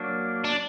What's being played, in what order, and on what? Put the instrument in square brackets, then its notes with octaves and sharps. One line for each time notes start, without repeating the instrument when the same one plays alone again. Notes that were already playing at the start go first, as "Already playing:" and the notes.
Already playing: [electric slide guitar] F#3 A#3 D4
[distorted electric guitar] D4